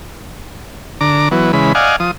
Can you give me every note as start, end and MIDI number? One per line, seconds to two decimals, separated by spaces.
1.01 1.29 50
1.01 1.29 82
1.01 1.29 86
1.31 1.52 52
1.31 1.52 54
1.31 1.52 59
1.53 1.73 49
1.53 1.73 52
1.53 1.73 56
1.53 1.73 83
1.75 1.96 74
1.75 1.96 75
1.75 1.96 77
1.75 1.96 78
1.75 1.96 80
2.00 2.11 53
2.00 2.11 87